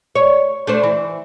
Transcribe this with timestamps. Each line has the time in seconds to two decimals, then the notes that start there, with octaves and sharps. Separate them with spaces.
0.15 C#5
0.67 A3 D4 C5
0.84 E3